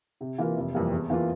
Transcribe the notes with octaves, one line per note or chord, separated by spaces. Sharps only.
C3
E3 A#3 F4 A#4
F1
F2 E3 G3 A#3
E2
E3 A#3 F4